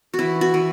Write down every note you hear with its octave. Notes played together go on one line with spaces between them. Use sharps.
F#4
E3 E4
F#4
E3